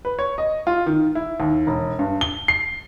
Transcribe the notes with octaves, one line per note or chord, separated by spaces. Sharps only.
B4
C#5
D#5
F4
D#3
E4
D#2
E1
G2
G7
C7